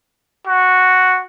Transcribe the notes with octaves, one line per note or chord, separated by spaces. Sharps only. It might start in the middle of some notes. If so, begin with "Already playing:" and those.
F#4